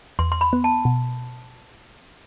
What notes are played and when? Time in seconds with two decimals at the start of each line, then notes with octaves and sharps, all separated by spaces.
0.19 E2 C6
0.32 C6
0.41 B5
0.53 B3
0.64 A5
0.85 B2